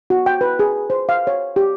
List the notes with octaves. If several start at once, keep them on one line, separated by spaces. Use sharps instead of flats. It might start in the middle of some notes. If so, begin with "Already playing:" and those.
F#4
G5
B4
G#4
C5
F5
C#5
G4